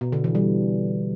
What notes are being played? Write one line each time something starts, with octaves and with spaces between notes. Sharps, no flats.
B2
D3
E3
G3